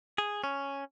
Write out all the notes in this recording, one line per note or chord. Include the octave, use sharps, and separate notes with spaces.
G#4
C#4